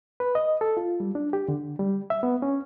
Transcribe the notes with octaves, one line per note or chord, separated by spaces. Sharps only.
B4
D#5
A4
F4
G3
D4
G4
D3
G3
E5
B3
C#4